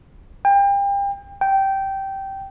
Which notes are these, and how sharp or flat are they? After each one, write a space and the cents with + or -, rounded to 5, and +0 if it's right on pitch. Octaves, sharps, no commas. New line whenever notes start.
G5 +30
G5 -15